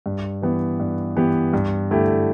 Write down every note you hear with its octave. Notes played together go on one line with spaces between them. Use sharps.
G2
E3 B3 G4
G2
E3 B3 G4
G2
D3 A3 E4 G4